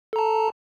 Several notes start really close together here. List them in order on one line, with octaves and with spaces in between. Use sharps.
A4 A#5 A5